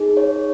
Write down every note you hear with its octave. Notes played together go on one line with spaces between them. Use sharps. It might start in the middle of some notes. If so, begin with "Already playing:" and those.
Already playing: D#4 G#4
C#5